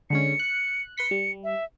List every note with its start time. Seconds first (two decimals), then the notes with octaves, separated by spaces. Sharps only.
0.10 D3 G#3 C#4 C#7
0.40 F#6
0.98 B4 C6 B6 C#7
1.11 G3
1.44 E5